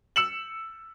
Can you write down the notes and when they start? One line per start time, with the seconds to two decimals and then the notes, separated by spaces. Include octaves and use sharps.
0.16 E6 C#7 E7 F#7